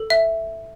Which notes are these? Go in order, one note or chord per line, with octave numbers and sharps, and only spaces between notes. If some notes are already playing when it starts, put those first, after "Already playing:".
Already playing: A4
E5